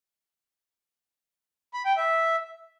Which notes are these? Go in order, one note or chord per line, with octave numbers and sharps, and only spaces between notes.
B5
G5
E5